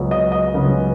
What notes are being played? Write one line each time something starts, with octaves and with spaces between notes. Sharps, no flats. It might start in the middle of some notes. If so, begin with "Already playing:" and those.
Already playing: C#2 C#3 F#3 B3
D#5
D#5
C#2 C#3 F#3 B3